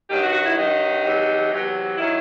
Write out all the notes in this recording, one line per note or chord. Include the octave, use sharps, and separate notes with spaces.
G2 D#3 F#3 G4
F#4
F#4
E4
G2 D#3 F#3 D#4
E2 C3 F#3
E2 C3 F#3
D#3 F#3 E4